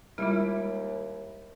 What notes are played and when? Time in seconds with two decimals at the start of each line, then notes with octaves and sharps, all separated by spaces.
0.18 D#2 G3 G#3 E4 F4